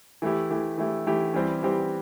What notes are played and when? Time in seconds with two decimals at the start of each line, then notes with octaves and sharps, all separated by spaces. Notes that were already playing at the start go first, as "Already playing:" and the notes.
0.22 E3 A3 E4 G4
0.50 E3 A3 E4 G4
0.78 E3 A3 E4 G4
1.07 E3 A3 E4 G4
1.34 E3 G3 C4 G4
1.63 E3 G3 C4 G4